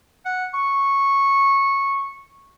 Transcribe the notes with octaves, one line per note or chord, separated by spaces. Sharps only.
F#5
C#6